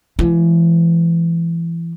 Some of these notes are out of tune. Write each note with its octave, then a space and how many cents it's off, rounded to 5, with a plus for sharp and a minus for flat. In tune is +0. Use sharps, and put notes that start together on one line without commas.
E3 +25 G#3 +30